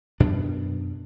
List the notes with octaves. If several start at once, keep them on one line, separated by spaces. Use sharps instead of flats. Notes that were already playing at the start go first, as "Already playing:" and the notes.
F#2 B2 D4